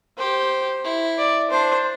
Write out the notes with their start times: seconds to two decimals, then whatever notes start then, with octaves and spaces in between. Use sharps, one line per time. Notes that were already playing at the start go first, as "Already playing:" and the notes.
0.18 G4 C5
0.84 E4
1.18 D5
1.50 D4 C5